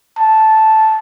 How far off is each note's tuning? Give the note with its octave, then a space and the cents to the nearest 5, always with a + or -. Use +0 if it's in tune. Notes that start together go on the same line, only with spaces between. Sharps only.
A5 -5